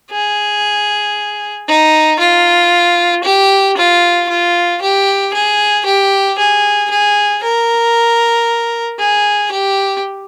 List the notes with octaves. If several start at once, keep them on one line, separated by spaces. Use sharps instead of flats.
G#4
D#4
F4
G4
F4
F4
G4
G#4
G4
G#4
G#4
A#4
G#4
G4